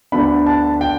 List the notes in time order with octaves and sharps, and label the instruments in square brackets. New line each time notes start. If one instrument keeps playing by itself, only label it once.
[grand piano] D2 D3 B3 D4 B5
A5
G5